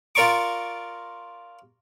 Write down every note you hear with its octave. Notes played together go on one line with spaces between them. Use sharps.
F4 A#4 D5 A#5 C#6 D6